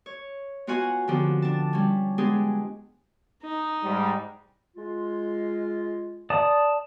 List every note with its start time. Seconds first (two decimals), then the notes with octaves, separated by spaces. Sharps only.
0.06 C#5
0.67 B3 F4 F#4 F#5 G#5
1.08 D3 F3 B3 C4 G4
1.42 D4 A5
1.73 G3 C#4
2.18 G#3 B3 D4 G4 G#4
3.43 D#4
3.83 G#2 G3
4.77 G#3 F4
6.30 D5 A5 D#6